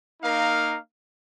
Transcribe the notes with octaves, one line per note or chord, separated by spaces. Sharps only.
A#3 D#4 A#4 F5